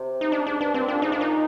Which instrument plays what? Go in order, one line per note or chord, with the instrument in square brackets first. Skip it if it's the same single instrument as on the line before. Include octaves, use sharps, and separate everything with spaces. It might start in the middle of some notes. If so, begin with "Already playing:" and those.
Already playing: [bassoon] C3
[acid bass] D#4
D4
[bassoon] G#2 [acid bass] D4
[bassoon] G2 [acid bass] D4
[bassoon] G2 [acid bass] C4
[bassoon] A#2 [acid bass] D4
[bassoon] G#2 [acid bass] D#4
[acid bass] D4
[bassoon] A#2 [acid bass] D#4